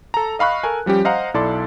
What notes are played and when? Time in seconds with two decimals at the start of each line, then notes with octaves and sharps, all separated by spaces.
0.14 A4 A#5
0.39 D#5 F5 B5 C#6 F#6
0.63 A4 A#4 G#5
0.86 F3 G3 C#4 G4
1.05 C5 D#5 F5 F#5 A#5
1.34 B1 E4 A4 D5 C6